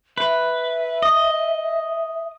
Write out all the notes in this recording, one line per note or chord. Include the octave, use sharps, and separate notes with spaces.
B4 E5
D#5